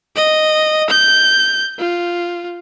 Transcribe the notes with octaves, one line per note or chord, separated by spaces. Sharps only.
D#5
G6
F4